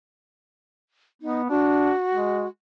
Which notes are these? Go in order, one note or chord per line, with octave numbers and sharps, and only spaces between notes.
B3 D#4
D4 F#4
G#3